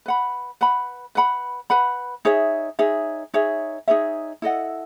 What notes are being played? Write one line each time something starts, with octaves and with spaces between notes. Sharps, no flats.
B4 F#5 B5
B4 F#5 B5
B4 F#5 B5
B4 F#5 B5
D#4 G#4 C#5 E5
D#4 G#4 C#5 E5
D#4 G#4 C#5 E5
D#4 G#4 C#5 E5
E4 A4 D#5 F#5